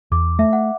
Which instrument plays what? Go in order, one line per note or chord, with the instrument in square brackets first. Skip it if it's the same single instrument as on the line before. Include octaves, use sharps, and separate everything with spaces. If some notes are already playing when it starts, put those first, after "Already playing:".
[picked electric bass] E2 [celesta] D6
[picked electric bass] A3 [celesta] E5
[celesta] F#5